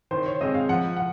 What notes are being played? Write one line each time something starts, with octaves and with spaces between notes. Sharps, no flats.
D#3 C5
C#5
G#3 C4 D#5
F5
F3 F#5
F#5